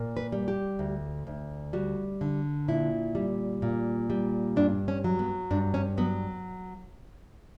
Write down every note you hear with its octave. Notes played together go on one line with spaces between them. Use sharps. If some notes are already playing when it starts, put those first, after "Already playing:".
Already playing: A#2
B4
G3
G4
D2
D2
G3 F#4
D3
A#2 E4
G3
A#2
G3
G2 D4
C#4
F#3
B3
G2 D4
C#4
F#3 B3